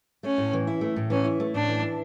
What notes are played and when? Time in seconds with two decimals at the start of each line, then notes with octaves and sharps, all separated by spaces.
0.23 A3 C#4
0.38 A2
0.53 E3
0.67 E4
0.81 A3
0.96 A2
1.10 E3 C#4
1.25 E4
1.40 A3
1.54 A2 D4
1.68 E3
1.83 E4